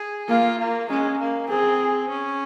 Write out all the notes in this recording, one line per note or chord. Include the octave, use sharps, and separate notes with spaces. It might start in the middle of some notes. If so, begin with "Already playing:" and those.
Already playing: G#4
A#3 F4
A#3
G#3 C#4
A#3
C4 G#4
C#4